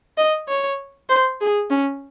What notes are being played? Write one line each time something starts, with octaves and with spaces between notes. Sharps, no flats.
D#5
C#5
C5
G#4
C#4